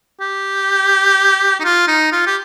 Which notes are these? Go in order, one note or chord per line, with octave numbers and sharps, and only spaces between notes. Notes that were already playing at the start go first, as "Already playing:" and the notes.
G4
D#4
F4
D#4
F4
G4